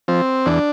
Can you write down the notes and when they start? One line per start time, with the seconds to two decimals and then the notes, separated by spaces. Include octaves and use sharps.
0.08 F3 C4
0.46 E2 D4